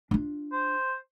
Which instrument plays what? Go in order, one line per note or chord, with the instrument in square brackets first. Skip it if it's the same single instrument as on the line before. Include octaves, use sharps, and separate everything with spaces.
[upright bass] D4 F4
[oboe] C5